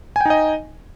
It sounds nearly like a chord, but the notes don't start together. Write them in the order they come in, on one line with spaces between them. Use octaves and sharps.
G#5 G5 D#4 D#5